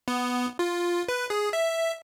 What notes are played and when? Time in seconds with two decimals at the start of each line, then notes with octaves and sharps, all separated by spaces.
0.08 B3
0.59 F4
1.08 B4
1.30 G#4
1.53 E5